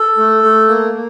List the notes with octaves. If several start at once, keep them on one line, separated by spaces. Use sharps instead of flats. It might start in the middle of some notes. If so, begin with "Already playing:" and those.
Already playing: A4
A3
A3
A#3
A#3